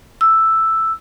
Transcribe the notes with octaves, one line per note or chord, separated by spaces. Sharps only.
E6